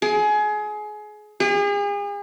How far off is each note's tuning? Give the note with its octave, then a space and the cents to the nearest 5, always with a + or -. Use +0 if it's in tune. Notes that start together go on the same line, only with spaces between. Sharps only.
G#4 +25
G#4 -40